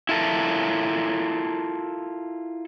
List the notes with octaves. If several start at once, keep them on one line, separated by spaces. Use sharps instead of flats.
E4 F4 A4 A#4